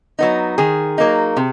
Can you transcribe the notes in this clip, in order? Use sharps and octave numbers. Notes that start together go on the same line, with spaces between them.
F#3 B3 D#4
D#3 G#4
F#3 A#3 D#4
C3